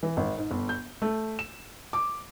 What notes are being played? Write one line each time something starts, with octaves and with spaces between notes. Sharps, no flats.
E3
G#1
G#2
G1
G6
A3
E7
D6